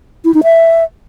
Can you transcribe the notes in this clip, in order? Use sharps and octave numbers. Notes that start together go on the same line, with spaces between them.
E4
D#4
E5